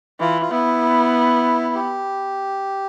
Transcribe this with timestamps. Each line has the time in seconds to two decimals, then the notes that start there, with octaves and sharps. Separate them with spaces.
0.20 E3 F4
0.42 F4
0.51 B3 E4
1.75 G4